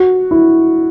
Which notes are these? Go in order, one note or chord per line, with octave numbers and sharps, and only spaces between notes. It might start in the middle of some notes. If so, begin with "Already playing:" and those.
Already playing: F#4
E4